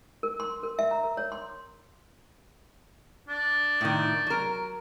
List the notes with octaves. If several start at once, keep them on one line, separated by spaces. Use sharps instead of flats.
A#4
C6
A#4
E5
A#5
A#4
C#5
C6
D4
A2 D#3
F#3 A#4